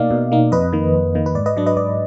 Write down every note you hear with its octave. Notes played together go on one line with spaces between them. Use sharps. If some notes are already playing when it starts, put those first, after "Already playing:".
Already playing: B2 A#3 D#4 D5 F5
B2
A#3 D#4
F2 B4 D#5
D#3 A#3
F2
D#3 A#3
B4
G#2 D5
B4 D#5
F#3 D4 D5
B4 D#5
G#2 D5